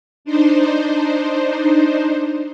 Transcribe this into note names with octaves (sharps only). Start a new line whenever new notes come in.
D4 D#4 C5